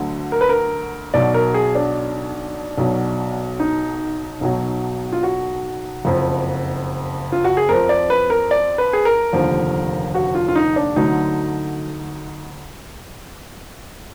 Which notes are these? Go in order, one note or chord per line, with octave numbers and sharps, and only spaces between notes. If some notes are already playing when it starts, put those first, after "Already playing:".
Already playing: D2 D3 F#3
A#4
B4
A#4
B1 B2 F#3 D5
A#4
G#4
D4
B1 B2 F#3
D#4
B1 B2 F#3
F4
F#4
F#1 F2 F3
F4
F#4
G#4
F2 F3 A#4
D5
B4
A#4
D5
B4
G#4
A#4
F1 D#2 D3 F3
F#4
F4
F4
D#4
D4
D2 D3 F#3 D#4